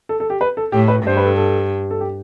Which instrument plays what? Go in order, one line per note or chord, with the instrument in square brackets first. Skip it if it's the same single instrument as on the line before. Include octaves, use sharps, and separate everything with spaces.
[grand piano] A4
A4
G4
B4
A4
[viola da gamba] A2 [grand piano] G4
[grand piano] B4
[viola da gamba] G2 [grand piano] C5
[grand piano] B4
A4
A4
A4
G4